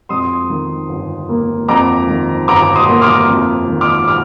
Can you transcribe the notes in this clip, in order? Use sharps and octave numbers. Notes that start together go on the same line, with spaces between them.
F2 C6 D#6
D#3
G1
A#3
F2 A#5 D6
D#3
G1 A#5 D6
C6 D#6
A#3
D6 F6
F2
D#3
D6 F6
D6 F6